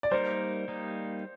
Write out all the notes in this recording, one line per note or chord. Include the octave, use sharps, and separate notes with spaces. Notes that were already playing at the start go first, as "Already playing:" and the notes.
D5
G3 A#3 D#4 A#4 C5
G3 A#3 D#4